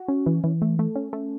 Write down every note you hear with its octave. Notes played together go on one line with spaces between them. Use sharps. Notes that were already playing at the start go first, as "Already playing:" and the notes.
Already playing: F#4
C#4
E3
E3
A3
A3
C#4
A3